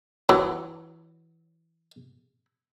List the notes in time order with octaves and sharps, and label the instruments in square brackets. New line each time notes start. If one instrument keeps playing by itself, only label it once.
[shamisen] E3 [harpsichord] F#3